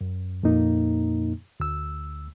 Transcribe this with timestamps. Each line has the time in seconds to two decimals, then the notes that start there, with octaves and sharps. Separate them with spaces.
0.01 F#2
0.43 F2 A#2 A#3 D#4
1.60 D2 E6